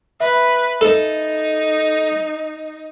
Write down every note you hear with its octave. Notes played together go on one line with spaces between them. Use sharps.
B4 E5
D#4 A4